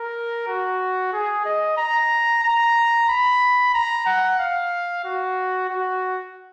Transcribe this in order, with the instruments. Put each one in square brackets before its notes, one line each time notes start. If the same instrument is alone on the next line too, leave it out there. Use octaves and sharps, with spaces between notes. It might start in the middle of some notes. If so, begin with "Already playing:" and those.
Already playing: [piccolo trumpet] A#4
F#4
G#4
D#5
A#5
A#5
B5
A#5
F#5
F5
F#4
F#4